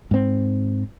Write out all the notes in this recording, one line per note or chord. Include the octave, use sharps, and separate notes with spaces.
G#2 C4